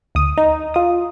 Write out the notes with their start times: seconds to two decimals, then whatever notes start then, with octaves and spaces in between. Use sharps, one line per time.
0.15 D2 D#6
0.38 D#4
0.74 F4 D#6